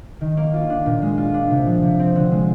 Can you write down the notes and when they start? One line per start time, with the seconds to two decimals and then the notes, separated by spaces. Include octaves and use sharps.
0.21 D#3
0.37 A#3
0.54 F4
0.70 D4
0.86 A#2
1.02 G#3
1.18 F4
1.34 D4
1.51 C3
1.67 F3
1.83 C3
1.99 C4
2.16 D3
2.32 G#3